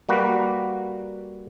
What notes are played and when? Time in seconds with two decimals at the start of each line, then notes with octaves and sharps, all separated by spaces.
0.09 G3 A#3 F#4 B4